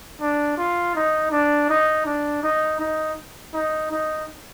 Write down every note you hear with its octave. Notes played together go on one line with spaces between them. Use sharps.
D4
F4
D#4
D4
D#4
D4
D#4
D#4
D#4
D#4